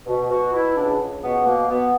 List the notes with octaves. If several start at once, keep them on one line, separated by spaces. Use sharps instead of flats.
B2
B2 F#4
B2 E4
C#2 D4
C#2
B2 B3
B2 A#3
B2 B3